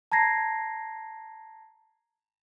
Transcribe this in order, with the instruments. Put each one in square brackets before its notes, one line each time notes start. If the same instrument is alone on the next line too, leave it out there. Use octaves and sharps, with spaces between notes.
[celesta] A5 A#5 G#6 A#6 C7